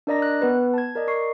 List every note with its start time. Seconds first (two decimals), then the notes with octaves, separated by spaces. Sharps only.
0.07 D4 A#4 D5 D#5 A#5 A#6
0.22 F#6
0.42 B3 B4
0.74 A5 G#6
0.95 A#4 D5 D#5
1.08 A#4 C#6 C7